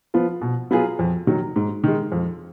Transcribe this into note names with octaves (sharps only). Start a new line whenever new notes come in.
F3 B3 F4
B2
F#3 B3 F4 G#4
F2
D#3 F#3
G#2
D#3 G#3
F2